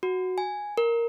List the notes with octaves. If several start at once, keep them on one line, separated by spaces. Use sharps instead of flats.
F#4
G#5
A#4